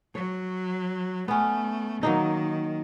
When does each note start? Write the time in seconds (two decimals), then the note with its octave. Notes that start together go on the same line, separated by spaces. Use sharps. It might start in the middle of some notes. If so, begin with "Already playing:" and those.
0.15 F#3 C#5
1.28 A3 B3 C#4
2.03 D#3 F#3 A#3 D#4